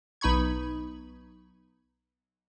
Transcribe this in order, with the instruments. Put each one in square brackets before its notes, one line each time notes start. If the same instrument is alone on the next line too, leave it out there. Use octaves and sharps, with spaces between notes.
[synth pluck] B1 D#4 B5 C#6 G#6